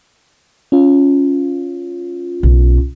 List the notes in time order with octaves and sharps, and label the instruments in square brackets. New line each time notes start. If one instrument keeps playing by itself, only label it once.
[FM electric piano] C#4 F4
[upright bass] B1